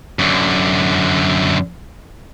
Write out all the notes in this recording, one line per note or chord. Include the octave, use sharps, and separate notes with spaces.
F#2 D3